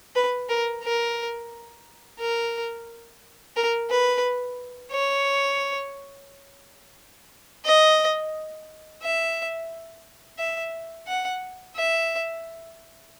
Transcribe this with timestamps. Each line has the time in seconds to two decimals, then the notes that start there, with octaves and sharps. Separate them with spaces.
0.16 B4
0.49 A#4
0.84 A#4
2.20 A#4
3.56 A#4
3.90 B4
4.92 C#5
7.66 D#5
9.03 E5
10.39 E5
11.07 F#5
11.76 E5